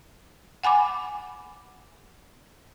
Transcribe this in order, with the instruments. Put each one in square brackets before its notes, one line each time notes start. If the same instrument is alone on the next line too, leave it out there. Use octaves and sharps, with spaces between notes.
[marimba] F#5 G#5 B5 D6